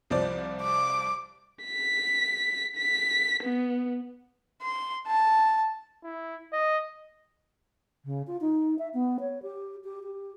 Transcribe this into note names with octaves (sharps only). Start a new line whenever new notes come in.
C2 F3 D5
D6
B6
B6
B3
C6
A5
E4
D#5
C#3
F4
D#4
E5
B3
C#5
G4
G4
G4